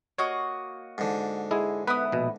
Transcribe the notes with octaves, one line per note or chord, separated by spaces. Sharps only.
A#3 F#4 C#5 D#5
G#2 D3
G#3 E4 G#4
B3 E4 B4 D#6
A#1 B2